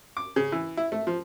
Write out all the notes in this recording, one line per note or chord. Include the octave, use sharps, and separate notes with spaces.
D6
C#3
E3
E4
A3
F3